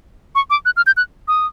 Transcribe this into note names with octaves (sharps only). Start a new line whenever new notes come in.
C#6
D6
F#6
F6
G6
F#6
D#6